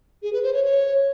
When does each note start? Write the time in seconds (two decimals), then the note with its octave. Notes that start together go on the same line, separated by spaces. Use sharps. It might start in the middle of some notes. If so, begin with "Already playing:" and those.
0.23 G#4
0.33 B4
0.43 C5
0.54 C#5
0.64 C#5